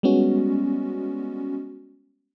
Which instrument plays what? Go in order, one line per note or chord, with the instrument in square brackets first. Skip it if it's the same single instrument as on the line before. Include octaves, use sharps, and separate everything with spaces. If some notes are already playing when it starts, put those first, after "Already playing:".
[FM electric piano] G3 G#3 B3 C#4 F#4